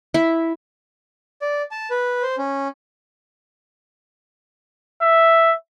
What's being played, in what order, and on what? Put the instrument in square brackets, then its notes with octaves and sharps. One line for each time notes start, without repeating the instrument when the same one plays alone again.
[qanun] E4
[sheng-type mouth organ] D5
A5
B4
C5
C#4
[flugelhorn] E5